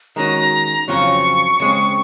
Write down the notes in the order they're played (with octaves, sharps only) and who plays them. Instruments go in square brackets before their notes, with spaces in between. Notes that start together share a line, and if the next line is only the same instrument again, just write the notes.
[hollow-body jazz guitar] D#3 G#3 C#4 F#4 [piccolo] A#5
[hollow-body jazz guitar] F2 C#3 F#3 C4 F4 [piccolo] C#6
[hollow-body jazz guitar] C#3 G#3 C4